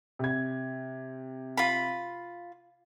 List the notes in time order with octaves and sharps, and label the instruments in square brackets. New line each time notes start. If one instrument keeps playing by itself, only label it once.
[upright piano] C3 G#6
[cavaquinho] F4 B5